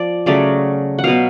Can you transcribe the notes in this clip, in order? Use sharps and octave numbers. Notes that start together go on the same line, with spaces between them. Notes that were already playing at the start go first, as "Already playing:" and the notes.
Already playing: F3 D5
C#3 F#3 A3 C#4 D5
F#5
B2 F#3 B3 F5